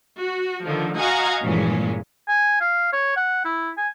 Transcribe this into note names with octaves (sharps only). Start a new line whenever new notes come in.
F#4
D3 D#3 F3
F#4 D#5 F5 F#5 G#5 A#5
G2 A#2 E3 F3 G#3 C#4
G#5
F5
C#5
F#5
E4
G#5